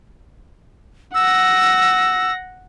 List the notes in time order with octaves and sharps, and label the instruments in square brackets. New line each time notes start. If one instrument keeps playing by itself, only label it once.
[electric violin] F#5 A#6 [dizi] E6